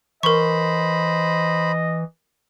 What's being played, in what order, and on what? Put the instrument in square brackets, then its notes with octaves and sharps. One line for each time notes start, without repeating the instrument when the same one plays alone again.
[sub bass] E3 [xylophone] A#4 C#6 [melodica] C5 B5 [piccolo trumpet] D#5